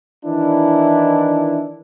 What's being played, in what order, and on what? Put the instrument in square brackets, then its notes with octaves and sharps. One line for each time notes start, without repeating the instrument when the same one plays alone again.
[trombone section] D#3 E3 D4 E4